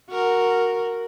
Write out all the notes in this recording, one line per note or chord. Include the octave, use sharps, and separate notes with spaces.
F#4 A#4